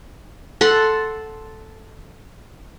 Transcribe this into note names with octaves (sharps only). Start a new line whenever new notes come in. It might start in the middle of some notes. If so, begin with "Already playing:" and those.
A4 F#5 C6